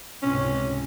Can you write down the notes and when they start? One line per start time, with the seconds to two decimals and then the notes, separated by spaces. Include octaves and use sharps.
0.22 C#2 G#2 C3 C#4